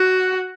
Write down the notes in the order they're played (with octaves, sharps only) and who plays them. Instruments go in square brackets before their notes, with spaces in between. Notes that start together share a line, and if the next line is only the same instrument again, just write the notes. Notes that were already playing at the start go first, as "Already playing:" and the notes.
Already playing: [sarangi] F#4